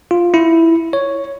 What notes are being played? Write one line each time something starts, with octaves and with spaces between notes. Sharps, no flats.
F4
E4
C#5